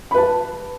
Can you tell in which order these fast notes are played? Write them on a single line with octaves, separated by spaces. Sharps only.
B5 B4 A5